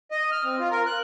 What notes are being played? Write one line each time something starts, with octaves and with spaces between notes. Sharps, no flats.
D#5
F6
C4
F4
A#4
F#6